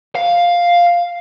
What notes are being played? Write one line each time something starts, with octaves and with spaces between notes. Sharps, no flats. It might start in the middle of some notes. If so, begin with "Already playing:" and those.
F5